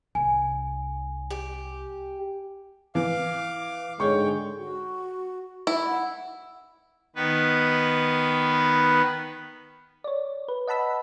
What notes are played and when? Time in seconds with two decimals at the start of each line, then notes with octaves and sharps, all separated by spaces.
0.15 C2 G#5
1.31 G4
2.95 E3 F5 D6
4.00 G#2 D3 G#3 C#5 G5 C#6
4.59 F#4
5.67 E4
5.87 F#5
7.16 D#3 B3 B4
10.04 C#5 D5
10.48 B4
10.67 D#5 F#5 A5 B5 E6 B6